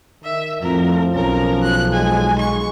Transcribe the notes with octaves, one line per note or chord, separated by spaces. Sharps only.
D#3 E5
F2 A2 F3 A#4
B1 C#4 A#4
F#6
G#3 G#5
C#6